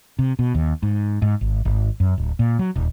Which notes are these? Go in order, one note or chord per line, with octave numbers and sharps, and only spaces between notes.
C3
B2
D#2
G#2
G#2
G#1
G#1
F#2
D1
A#2
F#3
D#1